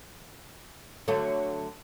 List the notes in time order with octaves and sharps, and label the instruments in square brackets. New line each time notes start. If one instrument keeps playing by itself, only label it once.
[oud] D3 F#3 A3